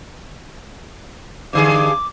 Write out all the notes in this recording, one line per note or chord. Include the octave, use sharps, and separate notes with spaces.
G2 D3 G#4 D6